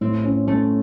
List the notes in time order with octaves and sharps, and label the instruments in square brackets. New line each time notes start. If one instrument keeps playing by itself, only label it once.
[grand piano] A2 [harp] C4
[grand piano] C#4
[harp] A3 [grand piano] C#4